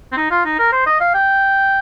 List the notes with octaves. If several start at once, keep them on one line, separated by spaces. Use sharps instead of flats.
C4
D#4
F4
D#4
A#4
C5
D#5
F5
G5